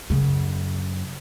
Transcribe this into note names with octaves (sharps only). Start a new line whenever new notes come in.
F#2 C#3